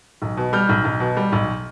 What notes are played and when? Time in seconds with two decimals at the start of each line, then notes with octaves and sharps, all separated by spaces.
0.22 B1
0.37 B2
0.53 G3 F6 G6
0.69 B1
0.84 B1
1.00 B2
1.17 G3
1.32 B1